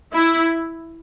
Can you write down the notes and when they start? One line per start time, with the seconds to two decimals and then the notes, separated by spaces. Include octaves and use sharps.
0.13 E4